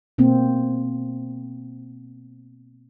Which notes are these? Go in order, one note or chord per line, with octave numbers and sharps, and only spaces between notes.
B2 A#3 C4